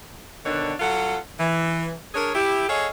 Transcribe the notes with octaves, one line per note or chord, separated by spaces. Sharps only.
B2 D3 D#3 D4 C#5
F#3 F4 A4 F#5
E3
D4 G#4 A#4 C#5
E4 G4
G#4 A4 C#5 D#5 F5